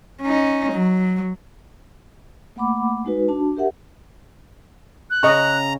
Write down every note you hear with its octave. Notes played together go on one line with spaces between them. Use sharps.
C#4 D#4
F#3
A3 A#3 F#5 B5 D6
G#3 D#4 F#4 B4
D4 F#4 A5
G4 A#4 E5 F#5
F#6
C#3 C#4 D#5 A#5 C#6